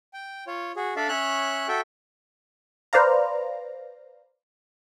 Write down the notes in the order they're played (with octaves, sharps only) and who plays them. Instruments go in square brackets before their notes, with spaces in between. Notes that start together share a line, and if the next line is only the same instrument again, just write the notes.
[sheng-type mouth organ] G5
F4 C#5
F#4 G#4
D4 A4 D5 E5 F5
C#4 C#5 E5 F#6
F#4 A4 E5 G5
[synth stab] B4 C5 D5 F5 A#5